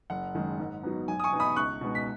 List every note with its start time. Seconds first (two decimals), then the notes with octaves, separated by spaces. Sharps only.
0.10 F#1 F#5
0.35 F#2 D#3 G#3
0.59 G#2
0.83 F#3 B3 D#4
1.08 B1 G#5
1.20 D#6
1.24 G#5 C#6
1.32 B2 B3 D#4
1.40 B5 D#6
1.56 C#2 C#6 F#6
1.81 B2 G#3 B3 D#4
1.95 B6